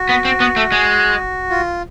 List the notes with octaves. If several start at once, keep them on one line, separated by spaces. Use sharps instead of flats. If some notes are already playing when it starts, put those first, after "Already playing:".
Already playing: F#4
B3
C4
B3
A3
G#3
F4